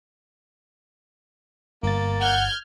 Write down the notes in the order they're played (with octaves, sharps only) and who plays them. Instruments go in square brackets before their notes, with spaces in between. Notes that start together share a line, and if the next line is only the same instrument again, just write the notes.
[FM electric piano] G1 A6 [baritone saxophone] A#3
[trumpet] F#5 [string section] F6 G6 G#6